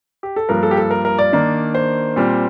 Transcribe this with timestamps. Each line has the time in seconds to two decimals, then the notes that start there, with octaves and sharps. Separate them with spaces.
0.23 G4
0.36 A4
0.49 G2 F3 A#3 A#4
0.63 A4
0.71 G4
0.77 A4
0.91 A#4
1.05 A#4
1.19 D5
1.33 D#3 A#3 D4
1.75 C5
2.16 A#2 G3 C4